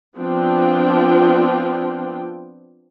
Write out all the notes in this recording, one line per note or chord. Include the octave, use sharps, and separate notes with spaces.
F3 B3 C4 D4 F4 G5